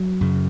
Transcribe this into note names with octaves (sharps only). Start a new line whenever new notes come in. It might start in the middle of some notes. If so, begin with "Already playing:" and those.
Already playing: F#3
F#2 C#3